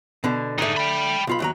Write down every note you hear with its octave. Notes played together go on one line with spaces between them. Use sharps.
B2 D3
D3 A3 D#4 G#4
G5 B5
B1 F4 B5
D#2 F#3 A#5